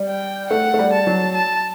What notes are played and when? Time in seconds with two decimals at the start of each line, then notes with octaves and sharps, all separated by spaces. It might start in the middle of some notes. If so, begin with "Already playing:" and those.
Already playing: G3
0.08 G5
0.50 A3 F#5
0.74 A3
0.79 G3
0.93 A5
1.07 F#3
1.35 A5